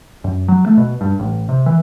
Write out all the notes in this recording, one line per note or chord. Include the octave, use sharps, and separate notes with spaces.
F#2
F#3
A3
B2
G2
A1
C3
E3